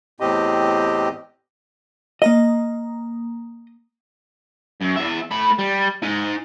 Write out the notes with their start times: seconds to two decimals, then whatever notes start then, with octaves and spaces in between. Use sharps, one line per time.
0.20 E2 A2 C4 G4 D#5
2.22 A#3 D#5 A#5 D#6
4.82 F#2
4.97 E2 E5
5.31 A3 B5
5.59 G3
6.03 D#4 G#5